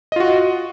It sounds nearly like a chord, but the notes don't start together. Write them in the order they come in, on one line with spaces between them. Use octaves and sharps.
D#5 F4 F#4